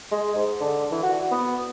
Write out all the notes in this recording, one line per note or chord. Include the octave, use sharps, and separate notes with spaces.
G#3
G#2
D3
E3
F#4
B3